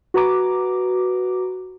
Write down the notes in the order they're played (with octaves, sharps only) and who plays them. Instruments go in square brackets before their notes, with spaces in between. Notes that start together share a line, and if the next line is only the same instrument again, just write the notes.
[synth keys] F#4 B4 A#5 D6